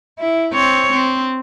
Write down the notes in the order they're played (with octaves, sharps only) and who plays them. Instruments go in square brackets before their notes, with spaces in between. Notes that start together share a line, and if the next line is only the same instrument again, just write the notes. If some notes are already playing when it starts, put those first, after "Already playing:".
[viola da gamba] E4
C4 C#5
C4